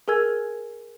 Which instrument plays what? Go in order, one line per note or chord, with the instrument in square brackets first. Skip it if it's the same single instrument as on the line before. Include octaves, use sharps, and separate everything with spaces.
[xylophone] G#4 A#4 G#5 E6 G#6